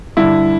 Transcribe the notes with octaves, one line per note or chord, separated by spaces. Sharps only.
G2 D3 E4